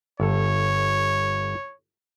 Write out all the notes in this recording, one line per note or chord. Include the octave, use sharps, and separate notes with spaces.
G1 A4 C#5